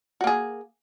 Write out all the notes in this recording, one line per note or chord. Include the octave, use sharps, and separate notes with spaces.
A#3 F#4 G#4